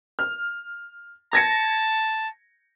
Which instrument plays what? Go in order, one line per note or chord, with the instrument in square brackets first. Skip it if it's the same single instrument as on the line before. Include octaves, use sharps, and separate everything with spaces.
[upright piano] F6
[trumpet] A5 [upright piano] G#6 A#6 C#7